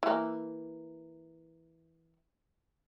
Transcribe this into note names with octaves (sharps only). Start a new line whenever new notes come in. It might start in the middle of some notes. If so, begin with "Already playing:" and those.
E3 A#3